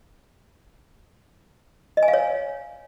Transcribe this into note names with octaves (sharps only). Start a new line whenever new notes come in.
D#5
G#5
F5
C#5